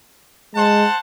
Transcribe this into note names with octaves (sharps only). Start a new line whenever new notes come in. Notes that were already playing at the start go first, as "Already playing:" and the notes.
G#3 C5 F#5 A5